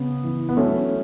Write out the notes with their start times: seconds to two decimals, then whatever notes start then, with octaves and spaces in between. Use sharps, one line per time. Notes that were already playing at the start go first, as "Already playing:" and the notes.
Already playing: C#3 B3
0.24 E3
0.49 B3
0.57 F#3 A3 C#4